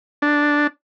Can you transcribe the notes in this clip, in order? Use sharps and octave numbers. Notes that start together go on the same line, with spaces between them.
D4